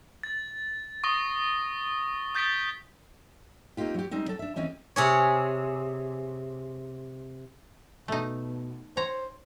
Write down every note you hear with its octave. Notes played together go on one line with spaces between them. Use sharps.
A6
C#6 D#6 A#6 G7
D#6 G6 A6 B6 D7 G7
A3 A#3 C4 D#4 F4 G4
F#3 G4
G3 G#3 C4 D#4
F#3 A4
D4 E5
D2 E3 C4 C#4 D#5
C3 G#4 C#5
B2 A3 D#4
C5 C#5 A#5